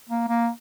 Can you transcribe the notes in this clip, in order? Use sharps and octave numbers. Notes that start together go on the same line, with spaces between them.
A#3
A#3